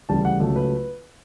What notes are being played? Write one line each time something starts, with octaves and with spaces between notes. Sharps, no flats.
D2 C#3 E3 G3 A5
F#5
C#2 C#3 F#3 A3 A4
B4